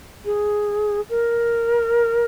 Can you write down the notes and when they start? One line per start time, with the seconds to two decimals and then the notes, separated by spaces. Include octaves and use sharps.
0.25 G#4
1.10 A#4